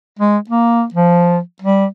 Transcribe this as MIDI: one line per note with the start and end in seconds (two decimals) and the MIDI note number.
0.19 0.38 56
0.49 0.85 58
0.94 1.39 53
1.62 1.86 55